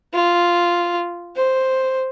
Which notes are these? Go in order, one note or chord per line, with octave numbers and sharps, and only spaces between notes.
F4
C5